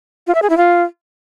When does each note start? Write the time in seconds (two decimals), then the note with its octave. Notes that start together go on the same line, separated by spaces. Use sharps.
0.27 F4
0.35 E5
0.42 G#4
0.50 E4
0.57 F4